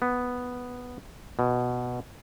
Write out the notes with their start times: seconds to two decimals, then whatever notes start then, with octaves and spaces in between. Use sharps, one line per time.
0.02 B3
1.39 B2